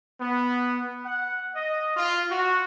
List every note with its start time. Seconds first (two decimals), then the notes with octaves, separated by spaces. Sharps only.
0.21 B3
1.04 F#5
1.55 D#5
1.94 F4
2.30 F#4